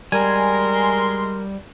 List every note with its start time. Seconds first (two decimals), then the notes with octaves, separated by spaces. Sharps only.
0.12 G3 G#3 A#4 G#5 C6